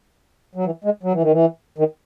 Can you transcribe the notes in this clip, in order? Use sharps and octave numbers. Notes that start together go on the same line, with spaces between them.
F#3
E3
G#3
F#3
E3
D#3
E3
D#3